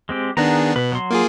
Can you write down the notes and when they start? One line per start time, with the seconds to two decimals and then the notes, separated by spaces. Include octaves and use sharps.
0.09 G#3 C4 G4
0.37 D#3 B3 D4 G#4 F#5 A#5
0.76 B2 B4
0.92 F#3 C6
1.11 A#3 F4 G#4